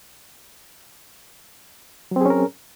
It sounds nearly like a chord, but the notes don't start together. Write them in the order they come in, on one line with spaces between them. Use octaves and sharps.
F#3 C4 G#4 C#4 A#4